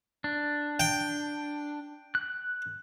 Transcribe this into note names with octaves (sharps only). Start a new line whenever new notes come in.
D4
G5
F#6